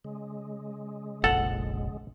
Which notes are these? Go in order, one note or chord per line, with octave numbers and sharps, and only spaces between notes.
C#3 G#3
F1 A#1 A4 F#5